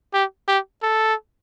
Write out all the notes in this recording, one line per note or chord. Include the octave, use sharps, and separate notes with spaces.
G4
G4
A4